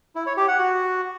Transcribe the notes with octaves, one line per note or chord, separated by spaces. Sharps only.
E4
C#5
G4
F#5
F#4